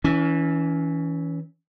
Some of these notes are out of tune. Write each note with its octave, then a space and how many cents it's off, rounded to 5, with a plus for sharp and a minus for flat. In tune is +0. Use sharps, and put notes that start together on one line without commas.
E3 -15 C#4 +25